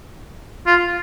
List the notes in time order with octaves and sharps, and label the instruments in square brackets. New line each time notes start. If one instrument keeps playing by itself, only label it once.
[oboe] F4